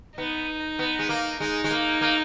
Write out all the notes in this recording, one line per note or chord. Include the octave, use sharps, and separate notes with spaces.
B3 D#4
B3
G#3
A#3
G#3 D#4
G#3
A#3
A#3